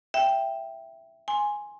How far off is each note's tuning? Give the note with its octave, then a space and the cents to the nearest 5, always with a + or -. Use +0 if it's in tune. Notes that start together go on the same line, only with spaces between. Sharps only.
E5 +10 G5 +0
G#5 +0 C6 +10